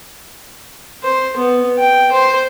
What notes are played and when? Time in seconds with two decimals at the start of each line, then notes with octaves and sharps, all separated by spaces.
1.03 C5
1.37 B3
1.79 G5
2.12 C5